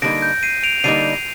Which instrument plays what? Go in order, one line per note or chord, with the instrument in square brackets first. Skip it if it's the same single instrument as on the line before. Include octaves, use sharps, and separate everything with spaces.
[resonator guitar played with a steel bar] D3 G3 A#3 D#4 [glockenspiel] A#6 D7
[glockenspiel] G6
C7 D#7
D7 F7
F7
[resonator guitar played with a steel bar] D3 G3 A#3 D#4 [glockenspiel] C7 D#7